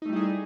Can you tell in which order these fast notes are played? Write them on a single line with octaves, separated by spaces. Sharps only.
D#4 A3 G3 E4 G#4